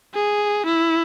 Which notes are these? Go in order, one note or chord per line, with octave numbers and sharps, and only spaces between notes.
G#4
E4